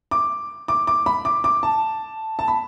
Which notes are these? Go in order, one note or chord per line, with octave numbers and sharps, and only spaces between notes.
D6
D6
D6
B5
D6
D6
A5
A5
B5